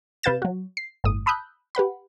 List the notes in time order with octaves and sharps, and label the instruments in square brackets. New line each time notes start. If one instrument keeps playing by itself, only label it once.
[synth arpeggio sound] C3 B4 F5 G6 A6 E7
F#3 F#4
C7
G1 A2 D#6
A5 B5 D#6 E6 F#6 G6
G4 B4 F#5 B5